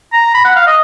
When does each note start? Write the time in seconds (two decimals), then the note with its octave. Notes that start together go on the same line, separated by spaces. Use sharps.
0.13 A#5
0.34 B5
0.45 F#5
0.56 F5
0.67 D#5